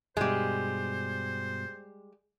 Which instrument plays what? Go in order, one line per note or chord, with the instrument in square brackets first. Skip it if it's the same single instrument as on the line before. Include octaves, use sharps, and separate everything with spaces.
[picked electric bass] G2 B2 [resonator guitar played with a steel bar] G3 G#3 [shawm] C5